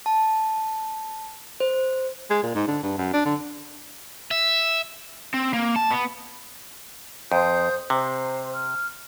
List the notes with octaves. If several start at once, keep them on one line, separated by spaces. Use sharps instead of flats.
A5
C5
G#3
A#2
G#2
D3
G2
F#2
D4
D3
E5
C4
A#3
A5
B3
F2 C5 D#6 G6
C3 C5
F6